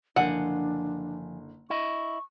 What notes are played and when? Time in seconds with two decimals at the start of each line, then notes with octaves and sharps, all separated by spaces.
0.16 F#1 D3 F3 D4 F5 F#5 G#5
1.70 E4 D#5 C#6